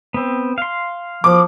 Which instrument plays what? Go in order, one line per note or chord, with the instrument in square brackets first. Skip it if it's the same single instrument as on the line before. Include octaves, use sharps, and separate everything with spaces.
[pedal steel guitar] B3 C4
F5 C6
[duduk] F3 [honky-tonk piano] D6